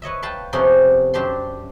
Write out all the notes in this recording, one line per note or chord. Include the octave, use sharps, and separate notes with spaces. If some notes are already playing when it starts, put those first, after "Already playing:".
B4 C#5 D#5 E5
B4 F5 G5 A5
F2 C3 B3 C#4 D5 C6
F#2 D4 G4 C5 A5 C6